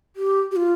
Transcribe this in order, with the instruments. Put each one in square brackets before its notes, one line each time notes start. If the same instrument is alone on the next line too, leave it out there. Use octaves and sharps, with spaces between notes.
[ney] G4
G4
F4